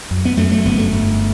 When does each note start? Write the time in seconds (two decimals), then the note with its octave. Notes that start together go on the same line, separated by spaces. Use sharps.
0.11 F#2
0.25 B3
0.37 F#2 A3
0.52 A3
0.65 G1 B3
0.78 A3
0.92 G1